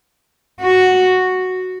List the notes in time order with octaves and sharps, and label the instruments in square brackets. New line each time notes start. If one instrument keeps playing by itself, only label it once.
[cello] F#4